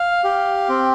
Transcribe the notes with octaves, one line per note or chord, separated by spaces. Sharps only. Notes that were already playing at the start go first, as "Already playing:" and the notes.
Already playing: F5
G4
C4